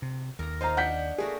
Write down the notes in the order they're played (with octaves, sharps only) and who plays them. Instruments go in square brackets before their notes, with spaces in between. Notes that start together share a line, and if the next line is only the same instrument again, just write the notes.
[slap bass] C3
[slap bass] D#2 [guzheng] A#4 A#5
[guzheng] D#4 F5 A5 [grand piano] C5 A#5
[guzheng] D4 [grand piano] F#5 G6 B6
[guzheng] A3 A#3 F#4 [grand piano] G#4